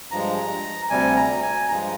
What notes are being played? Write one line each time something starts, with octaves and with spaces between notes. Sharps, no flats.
G2 F3 G#3 A#5
D2 C3 G3 G#5
A#5
G#5
G2 F3 G#3 A#5